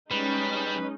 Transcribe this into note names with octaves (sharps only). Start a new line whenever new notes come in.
G3 G#3 C#4 D#4 B4